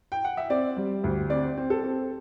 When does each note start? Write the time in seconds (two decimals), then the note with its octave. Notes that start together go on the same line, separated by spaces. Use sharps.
0.12 G5
0.24 F#5
0.37 E5
0.50 C4 D5
0.77 G3
1.04 D2
1.30 C4 D5
1.57 C4
1.70 A4
1.84 C4